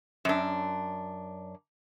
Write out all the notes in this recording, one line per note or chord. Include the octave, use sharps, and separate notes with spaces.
F#2 D4